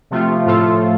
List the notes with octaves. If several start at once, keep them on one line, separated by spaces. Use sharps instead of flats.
C3 F3 A3 F4
A2 F3 A3 F4 A4